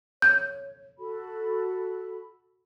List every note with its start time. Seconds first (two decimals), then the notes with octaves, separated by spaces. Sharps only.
0.22 C#5 G6
0.98 F#4 A4 B5